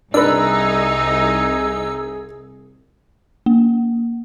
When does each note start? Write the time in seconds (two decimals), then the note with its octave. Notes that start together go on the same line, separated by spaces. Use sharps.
0.14 C2 D4 D#4 G#4 A#4 B4 E6
3.46 A#3